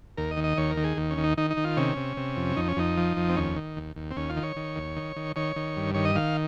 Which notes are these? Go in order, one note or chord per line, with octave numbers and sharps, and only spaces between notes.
D#2 A#4
D#5
D#3
D#5
D#2 C#5
A#4
D#3
G#4
D#2
C#4
D#3
D#4
D#3 D#4
D#4
D#3
F4
C3 C#4
C3
C3
F2
F2 D#4
C#4
F2 D#4
F3
F2
C4
D#2 C#4
D#3
D#2
D#2
C4
D#2 C#4
F4
D#3
C#5
D#3
D#2
D#3
D#3
D#3 C#5
D#3
G2
D#3 C#5
D#5
D#3 F5